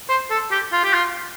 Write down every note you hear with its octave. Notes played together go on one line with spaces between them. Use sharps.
C5
A4
G4
F4
G4
F4